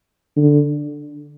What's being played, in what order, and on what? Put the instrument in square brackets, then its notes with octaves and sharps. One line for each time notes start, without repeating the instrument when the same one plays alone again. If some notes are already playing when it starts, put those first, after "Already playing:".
[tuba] D3